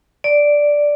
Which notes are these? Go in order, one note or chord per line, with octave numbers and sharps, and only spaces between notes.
D5